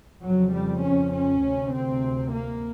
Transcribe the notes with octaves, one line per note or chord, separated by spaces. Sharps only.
F2 C#3 F#3
G3
C#4
C#4
D2 C3
C4
A#3